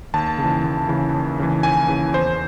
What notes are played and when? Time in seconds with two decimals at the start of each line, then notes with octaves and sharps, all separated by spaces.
0.14 D#2 A5
0.38 C#3 E3
0.64 D#2
0.89 C#3 E3
1.14 D#2
1.39 C#3 E3
1.63 D#2 G#5
1.88 C#3 E3
2.13 E2 C5